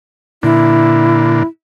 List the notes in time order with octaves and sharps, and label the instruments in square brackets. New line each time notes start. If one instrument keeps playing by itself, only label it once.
[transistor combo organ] A#2 D3 [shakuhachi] E4